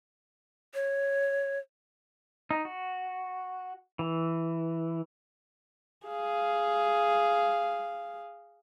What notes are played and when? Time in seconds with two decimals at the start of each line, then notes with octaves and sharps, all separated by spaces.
0.74 C#5
2.51 D#4
2.65 F#4
3.99 E3
6.07 G#4 F5